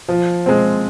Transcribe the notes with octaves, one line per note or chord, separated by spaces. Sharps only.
F3
G#3 C4